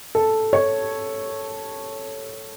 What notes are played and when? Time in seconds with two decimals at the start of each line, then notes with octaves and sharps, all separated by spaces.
0.15 A4
0.53 C#5